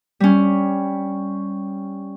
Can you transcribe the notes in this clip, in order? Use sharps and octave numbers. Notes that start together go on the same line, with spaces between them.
G3 C#4